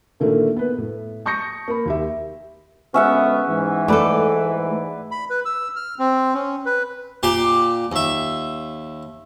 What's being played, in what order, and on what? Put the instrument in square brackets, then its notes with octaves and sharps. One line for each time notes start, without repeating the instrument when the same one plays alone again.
[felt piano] A#2 D3 D#3 A3 A#3
B3 B4
A2
A5 C#6 D#6 G6 A#6 C#7
A#3 B5
D#2 G4 E5
[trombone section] D2 G#3 B3 [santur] C#4 E5 F#5
[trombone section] G#2 E3
[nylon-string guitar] A3 A4 [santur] B4 D5
[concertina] B5
B4
E6
F6
C4
C#4
B4
[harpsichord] A#2 G4 C6 D6
D#2 E5